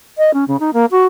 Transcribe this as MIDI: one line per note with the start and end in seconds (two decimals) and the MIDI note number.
0.18 0.33 75
0.34 0.44 61
0.48 0.56 49
0.60 0.70 63
0.73 0.85 58
0.91 1.06 66